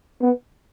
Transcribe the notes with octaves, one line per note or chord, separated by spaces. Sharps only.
B3